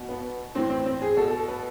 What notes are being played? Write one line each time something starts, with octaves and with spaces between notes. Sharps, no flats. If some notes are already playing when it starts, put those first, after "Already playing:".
Already playing: B2
B3
A2 E3 C4
C4
C4
G#4
B2 A4
A4
A4
B4